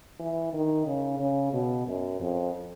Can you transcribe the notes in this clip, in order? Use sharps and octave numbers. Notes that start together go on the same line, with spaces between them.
E3
D#3
C#3
C#3
B2
F#2
F2